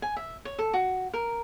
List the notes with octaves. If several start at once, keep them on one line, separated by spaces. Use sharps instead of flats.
G#5
E5
C#5
A4
F#4
A#4